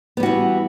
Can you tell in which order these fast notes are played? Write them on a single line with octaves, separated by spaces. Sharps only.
B3 G3 F#4 E3